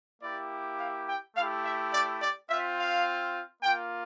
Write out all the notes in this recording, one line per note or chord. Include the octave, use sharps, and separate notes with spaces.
A#3 E4 G4 D5
F5
G5
A3 E4 G4 F5
E5
D5
D5
C4 F4 E5
F5
A#3 F4 G5